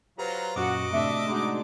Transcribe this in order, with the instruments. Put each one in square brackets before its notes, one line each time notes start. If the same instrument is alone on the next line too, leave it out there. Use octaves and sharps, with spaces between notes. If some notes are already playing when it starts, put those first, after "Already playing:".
[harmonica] F#3 F4 A#5 [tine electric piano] G4 B4 C5
[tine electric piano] F#2 A#2 [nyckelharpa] F#4 F#5 [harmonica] D#5 D6
[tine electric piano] A2 C3 A3 [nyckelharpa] D4 [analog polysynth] E5
[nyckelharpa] G#3 D4 [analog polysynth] D#4 F#4